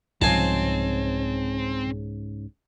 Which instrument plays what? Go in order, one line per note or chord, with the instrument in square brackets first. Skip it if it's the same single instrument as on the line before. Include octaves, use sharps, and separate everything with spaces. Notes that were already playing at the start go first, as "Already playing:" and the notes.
[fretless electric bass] C2 F3 [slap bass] G#2 C#3 [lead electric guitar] C4 [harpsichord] G#5 A5